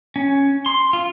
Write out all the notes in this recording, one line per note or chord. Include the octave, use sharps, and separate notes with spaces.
C#4
C6
F4